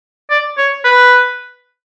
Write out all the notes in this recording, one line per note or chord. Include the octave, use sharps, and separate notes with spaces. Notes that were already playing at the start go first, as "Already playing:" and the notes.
D5
C#5
B4